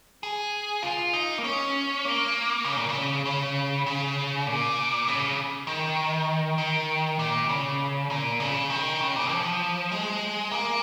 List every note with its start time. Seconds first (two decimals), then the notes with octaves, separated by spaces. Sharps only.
0.23 G#4
0.83 F4
1.13 D#4
1.38 A#3
1.44 C#4
2.05 A#3
2.64 C#3
2.76 A#2
2.89 C#3
3.25 C#3
3.86 C#3
4.47 A#2
5.08 C#3
5.67 D#3
6.58 D#3
7.19 A#2
7.49 C#3
8.10 A#2
8.40 C#3
8.70 D#3
9.00 C#3
9.16 A#2
9.32 F3
9.92 G#3
10.52 A#3